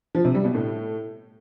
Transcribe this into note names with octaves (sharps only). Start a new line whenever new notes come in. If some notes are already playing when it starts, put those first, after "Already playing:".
F3
C3
G3
B2
A2